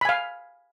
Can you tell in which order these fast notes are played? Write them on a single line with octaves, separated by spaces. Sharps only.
B5 G#5 F5